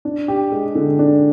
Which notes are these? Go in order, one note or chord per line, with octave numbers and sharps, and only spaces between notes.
D4
G4
G#3
D3
D4